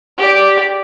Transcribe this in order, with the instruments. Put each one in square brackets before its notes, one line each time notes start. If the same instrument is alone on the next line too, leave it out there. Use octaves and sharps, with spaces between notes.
[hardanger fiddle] G4 D5